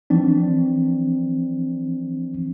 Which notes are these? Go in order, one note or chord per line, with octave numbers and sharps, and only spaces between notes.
E3 F3 C4 D4